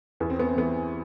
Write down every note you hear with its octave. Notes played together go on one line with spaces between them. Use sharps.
E2 B3
C4
B3
C4
E3 B3